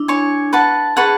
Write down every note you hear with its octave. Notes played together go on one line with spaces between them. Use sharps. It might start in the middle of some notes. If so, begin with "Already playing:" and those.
Already playing: D4 E4
C#5 G#5 C#6
B4 F#5 A5 C#6
G#4 B4 F#5 A5 C#6